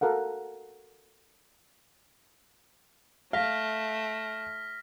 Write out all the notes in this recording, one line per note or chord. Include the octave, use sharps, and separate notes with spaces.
F#4 A4 A#4 F5 F#5
A3 F5 F6 A#6 B6